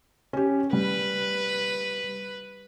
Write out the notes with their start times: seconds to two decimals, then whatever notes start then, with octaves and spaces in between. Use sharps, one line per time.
0.33 C#4 G4
0.73 G3 B4